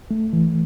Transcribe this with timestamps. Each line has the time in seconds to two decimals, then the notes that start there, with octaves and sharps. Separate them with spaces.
0.11 A3
0.33 E3